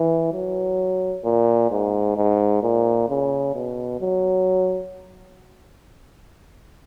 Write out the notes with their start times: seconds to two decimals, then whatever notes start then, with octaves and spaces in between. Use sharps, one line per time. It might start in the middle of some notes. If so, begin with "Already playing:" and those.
Already playing: E3
0.33 F#3
1.25 A#2
1.71 G#2
2.17 G#2
2.63 A#2
3.09 C#3
3.55 B2
4.00 F#3